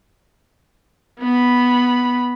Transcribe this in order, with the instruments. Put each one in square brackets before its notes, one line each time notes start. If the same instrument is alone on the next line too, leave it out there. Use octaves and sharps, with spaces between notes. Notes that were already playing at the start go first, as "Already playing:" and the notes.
[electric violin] B3 B5